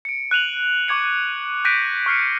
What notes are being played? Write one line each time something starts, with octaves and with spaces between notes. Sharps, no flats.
C#7 D7
F#6 D#7 F7 F#7
C#6 D6 G#6 C#7
F#6 G6 A#6 B6 D7 D#7
C#6 F6 C7 C#7